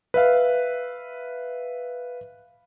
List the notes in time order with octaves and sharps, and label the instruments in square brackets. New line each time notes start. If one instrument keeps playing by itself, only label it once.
[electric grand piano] B4 E5 F5